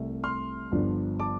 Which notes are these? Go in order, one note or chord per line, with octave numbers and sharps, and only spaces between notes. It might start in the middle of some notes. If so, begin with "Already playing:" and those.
Already playing: C2 C3 A3
C6 F6
G1 G2 F3 D4
A5 D6